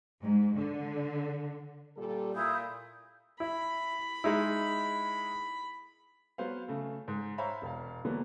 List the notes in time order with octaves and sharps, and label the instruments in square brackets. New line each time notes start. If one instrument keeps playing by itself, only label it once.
[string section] G#2
D3
[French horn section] A#2 G3 A4
[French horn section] A#2 [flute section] E4 D#6 G6
[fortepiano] E4 [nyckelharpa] B5
[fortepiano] G#3 D#4 E4
[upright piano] F#3 B3 C5 F5
C#3 A3
G#2
C5 C#5 E5 F5 A#5 B5
E1 F5
B2 D3 E3 F#3 A#3 B3